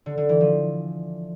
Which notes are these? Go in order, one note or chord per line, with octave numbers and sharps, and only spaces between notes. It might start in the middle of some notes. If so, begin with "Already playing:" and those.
D3
D3
E3
F3